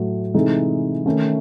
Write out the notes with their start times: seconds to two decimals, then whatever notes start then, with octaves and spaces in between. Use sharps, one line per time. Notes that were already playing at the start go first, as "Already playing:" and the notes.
Already playing: A2 F#3 A3
0.34 C3 E3 G#3 D#4 A4
1.06 D#3 A3 C#4